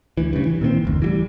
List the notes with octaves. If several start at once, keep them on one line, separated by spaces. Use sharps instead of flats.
D2 E3
G2 C#3
E3
A#2 D#3 A3 C4
F1 D2
E3 F#3 G3